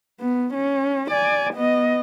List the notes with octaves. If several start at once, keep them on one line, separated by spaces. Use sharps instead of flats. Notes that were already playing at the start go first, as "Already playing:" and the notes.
B3
C#4
D5 G#5
B3 D#5